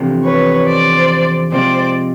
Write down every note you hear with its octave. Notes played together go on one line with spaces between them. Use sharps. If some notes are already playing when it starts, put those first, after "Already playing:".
Already playing: E2 C3 F3 A3 D4
B4 C#5
C5 D5
C3 F3 G#3 C4 C5 D5